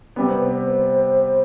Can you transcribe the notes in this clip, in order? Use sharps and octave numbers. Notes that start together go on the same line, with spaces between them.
C3 G3 B3
C5
B4
C5